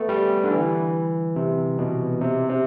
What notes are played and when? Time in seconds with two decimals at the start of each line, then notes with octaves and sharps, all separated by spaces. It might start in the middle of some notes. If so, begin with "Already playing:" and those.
Already playing: A3 B3
0.09 G3
0.44 D3
0.51 E3
1.36 C3
1.79 B2
2.21 C3
2.49 C3